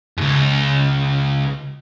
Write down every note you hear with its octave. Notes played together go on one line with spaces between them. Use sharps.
C#2 F#2